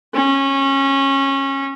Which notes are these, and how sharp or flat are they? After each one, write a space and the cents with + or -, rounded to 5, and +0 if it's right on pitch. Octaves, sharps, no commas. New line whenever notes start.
C#4 -20